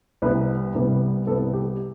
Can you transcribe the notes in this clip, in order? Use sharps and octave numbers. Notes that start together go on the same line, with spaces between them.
C2 C3 G3 B3 B4
C2 C3 G3 B3
C2 C3 G3 B3 A4
G4